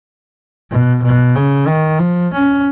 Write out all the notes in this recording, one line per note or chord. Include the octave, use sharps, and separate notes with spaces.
B2
B2
C#3
D#3
F3
C#4